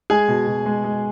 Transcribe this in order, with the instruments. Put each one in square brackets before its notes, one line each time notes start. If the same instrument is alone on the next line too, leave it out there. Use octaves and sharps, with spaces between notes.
[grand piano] G#3 G#4 G#5
B2
B2
G#3
G#3